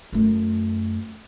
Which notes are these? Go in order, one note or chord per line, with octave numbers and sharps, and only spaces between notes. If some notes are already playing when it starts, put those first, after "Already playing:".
F#2 A3